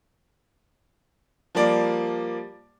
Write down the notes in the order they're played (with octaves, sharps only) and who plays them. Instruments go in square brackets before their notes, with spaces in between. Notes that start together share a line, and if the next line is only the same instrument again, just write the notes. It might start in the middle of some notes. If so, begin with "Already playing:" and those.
[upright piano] F3 G3 A#3 D5